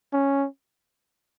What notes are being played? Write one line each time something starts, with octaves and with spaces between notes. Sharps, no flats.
C#4